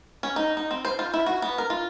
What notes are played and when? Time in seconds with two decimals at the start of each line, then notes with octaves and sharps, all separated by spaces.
0.23 C#4
0.36 D#4
0.57 D#4
0.71 C4
0.85 C5
0.99 F4
1.14 E4
1.26 F#4
1.42 B3
1.58 A#4
1.70 F4